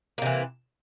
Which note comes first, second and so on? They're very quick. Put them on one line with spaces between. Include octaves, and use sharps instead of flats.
A#3 C3 E3